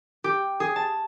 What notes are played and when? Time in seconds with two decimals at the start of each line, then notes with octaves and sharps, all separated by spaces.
0.24 G4
0.60 G#4
0.76 A5